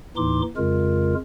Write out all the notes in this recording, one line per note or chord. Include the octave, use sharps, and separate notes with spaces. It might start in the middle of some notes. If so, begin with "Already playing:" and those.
D#2 A2 E3 D#4 C6 D6
F2 C#3 G#3 F4 A#4